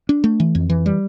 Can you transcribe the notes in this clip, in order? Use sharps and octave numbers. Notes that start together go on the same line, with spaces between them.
D4
A3
E3
F2
E3
G3